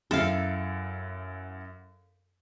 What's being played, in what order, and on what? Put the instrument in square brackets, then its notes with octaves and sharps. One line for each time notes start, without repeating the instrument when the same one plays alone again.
[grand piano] F#2 E4 [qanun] A4 F5